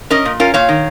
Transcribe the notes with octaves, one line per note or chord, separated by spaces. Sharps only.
C#4 A#4 D#5
A#2
C#4 F4 A#4
A#2 C#5 F5
D#3